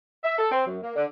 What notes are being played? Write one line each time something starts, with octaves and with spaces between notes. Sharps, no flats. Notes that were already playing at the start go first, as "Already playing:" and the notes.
E5
A4
C4
F#2
A#3
D3